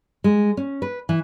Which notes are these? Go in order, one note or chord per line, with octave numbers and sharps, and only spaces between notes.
G#3
C#4
B4
E3